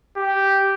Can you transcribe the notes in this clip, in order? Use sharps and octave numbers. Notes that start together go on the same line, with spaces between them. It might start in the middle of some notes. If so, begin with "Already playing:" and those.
G4